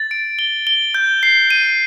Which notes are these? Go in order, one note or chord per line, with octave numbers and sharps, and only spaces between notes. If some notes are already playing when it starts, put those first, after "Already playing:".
Already playing: A6
D7
G7
G7
G6
C7
D#7